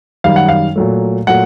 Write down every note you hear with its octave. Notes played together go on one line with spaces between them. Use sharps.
F#2 D#3 G3 F5
F#5
F5
A#2 F#3 A3
A#2 F#3 A3 F#5